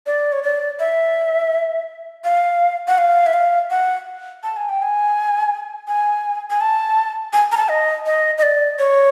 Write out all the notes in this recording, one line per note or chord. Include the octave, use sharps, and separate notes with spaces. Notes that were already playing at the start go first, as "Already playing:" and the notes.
D5
C#5
D5
E5
F5
F#5
F5
E5
F5
F#5
A5
G#5
G5
G#5
G#5
G#5
A5
G#5
A#5
A5
D#5
D#5
D#5
D5
C#5